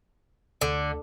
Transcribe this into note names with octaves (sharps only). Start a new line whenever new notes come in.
D2 D3